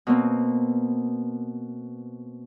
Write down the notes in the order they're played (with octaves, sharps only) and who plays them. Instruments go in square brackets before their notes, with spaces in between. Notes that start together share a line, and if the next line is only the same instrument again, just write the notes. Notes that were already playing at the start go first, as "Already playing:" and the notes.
[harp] B2 A#3 C4